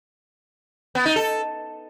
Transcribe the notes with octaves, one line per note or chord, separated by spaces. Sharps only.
B3
D#4
A4